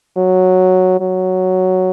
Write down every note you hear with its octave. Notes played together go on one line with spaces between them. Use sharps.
F#3
F#3